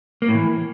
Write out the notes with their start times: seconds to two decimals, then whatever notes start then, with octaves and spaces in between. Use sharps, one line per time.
0.22 A#3
0.28 A2
0.35 E3